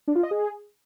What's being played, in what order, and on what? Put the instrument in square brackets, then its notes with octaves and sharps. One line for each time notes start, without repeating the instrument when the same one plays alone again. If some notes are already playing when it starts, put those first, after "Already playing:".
[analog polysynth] D4
F4
D#5
G#4